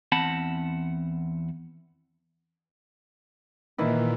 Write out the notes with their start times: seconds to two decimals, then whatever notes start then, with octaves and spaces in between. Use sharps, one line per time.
0.12 E2 C4 F#5 A5 B5
3.78 A#2 D#3 E3 E4